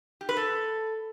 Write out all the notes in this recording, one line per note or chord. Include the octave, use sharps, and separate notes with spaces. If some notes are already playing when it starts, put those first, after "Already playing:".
G4
B4
A4